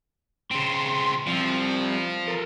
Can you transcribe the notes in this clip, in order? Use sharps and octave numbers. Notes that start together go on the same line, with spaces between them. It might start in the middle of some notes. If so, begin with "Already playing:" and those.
C#3 C4 C6
F3 G3 C4
A4 A#4